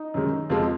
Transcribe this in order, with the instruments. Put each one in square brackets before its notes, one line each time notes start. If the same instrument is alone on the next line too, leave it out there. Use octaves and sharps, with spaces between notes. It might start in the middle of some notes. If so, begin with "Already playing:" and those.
Already playing: [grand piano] D#4
F#2 D#3 G#3
F2 F3 G#3 F4